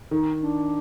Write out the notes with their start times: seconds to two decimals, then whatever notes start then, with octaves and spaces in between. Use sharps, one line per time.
0.11 D#3 D#4
0.40 D4